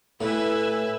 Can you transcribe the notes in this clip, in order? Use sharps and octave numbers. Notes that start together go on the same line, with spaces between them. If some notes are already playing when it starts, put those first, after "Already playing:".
A2 B4 E5 G#5